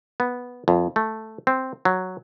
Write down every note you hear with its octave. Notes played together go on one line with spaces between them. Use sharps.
B3
F2
A3
C4
F#3